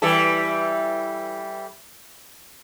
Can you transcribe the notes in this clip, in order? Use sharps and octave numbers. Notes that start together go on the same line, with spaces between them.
E3 G3 A4